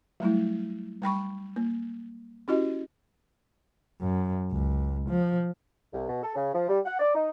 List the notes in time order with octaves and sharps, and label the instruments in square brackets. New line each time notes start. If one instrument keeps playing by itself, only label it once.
[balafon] F#3 G3 A3 E4
G3 G5 B5 C#6
A#3
C#4 E4 F#4 G4 D#5
[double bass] F#2
C#2
F3
[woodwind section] C2
B2
A4
C#3
F3
G3
F#5
D5
D#4